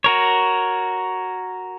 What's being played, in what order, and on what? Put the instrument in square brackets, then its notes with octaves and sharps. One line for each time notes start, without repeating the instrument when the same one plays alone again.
[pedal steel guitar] F#4 A#4 C#5